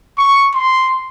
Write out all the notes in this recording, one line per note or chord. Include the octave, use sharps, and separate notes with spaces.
C#6
C6